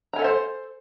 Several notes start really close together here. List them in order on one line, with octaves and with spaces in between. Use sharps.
A#5 G#5 A4 E5 C5